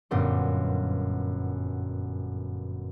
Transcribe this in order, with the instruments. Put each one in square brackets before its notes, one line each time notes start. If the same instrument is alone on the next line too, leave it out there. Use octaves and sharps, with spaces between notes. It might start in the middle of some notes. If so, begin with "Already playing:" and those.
[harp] G1 F#2 A#2 B3 G4 C6